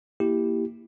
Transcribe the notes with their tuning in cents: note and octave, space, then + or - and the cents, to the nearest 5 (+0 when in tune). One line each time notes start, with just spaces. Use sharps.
A#3 +0 E4 +0 G4 +0